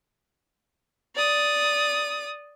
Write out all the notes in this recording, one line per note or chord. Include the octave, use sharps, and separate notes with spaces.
D5 D#6